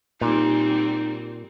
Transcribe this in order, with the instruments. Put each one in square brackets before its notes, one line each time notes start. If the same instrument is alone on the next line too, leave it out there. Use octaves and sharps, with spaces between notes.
[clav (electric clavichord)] A#2 [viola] G3 C4 [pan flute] D#4